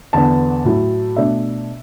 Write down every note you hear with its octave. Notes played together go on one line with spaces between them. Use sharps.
E2 D3 B3 A5
A2 F#3 A3 E4
B2 A3 D4 E5